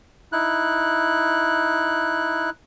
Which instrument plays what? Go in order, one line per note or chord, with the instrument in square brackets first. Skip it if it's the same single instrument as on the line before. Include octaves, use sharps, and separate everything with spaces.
[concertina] D#4 E4 F#6